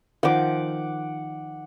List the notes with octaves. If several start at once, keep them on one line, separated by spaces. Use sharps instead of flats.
D#3 F3 F#5 D6